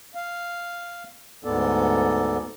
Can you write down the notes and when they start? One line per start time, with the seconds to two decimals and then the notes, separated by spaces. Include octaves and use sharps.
0.15 F5
1.44 D2 G#2 B3 A4 D5